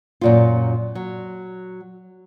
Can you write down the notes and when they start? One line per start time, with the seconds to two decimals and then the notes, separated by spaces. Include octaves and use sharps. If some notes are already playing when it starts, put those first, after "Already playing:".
0.21 F#2 A#2 F4
0.95 F#3